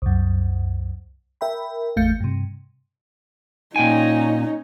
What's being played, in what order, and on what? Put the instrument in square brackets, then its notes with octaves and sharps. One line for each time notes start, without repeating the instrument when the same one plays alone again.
[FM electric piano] C2 F#2
A#4 E5 G5 B5
G#1 E2 A3 F5 G6 C#7
G2 C3
[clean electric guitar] A#2 G5 G#5 [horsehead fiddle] C#4 D#4